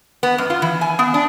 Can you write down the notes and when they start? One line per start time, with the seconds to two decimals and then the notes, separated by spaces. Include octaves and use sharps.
0.23 B3
0.38 F#2
0.50 F4
0.62 E3
0.81 G#5
0.99 B3
1.14 D4